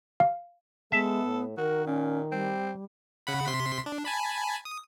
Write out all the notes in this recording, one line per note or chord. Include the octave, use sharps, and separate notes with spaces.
F5
G#3 B3 A4 E5
A2
D#3 F#4 A#4
A#2 C#4
G3 C4
C#3 F#5 B5
C3 C6 B6
D4
G#5 A5 B5
D#6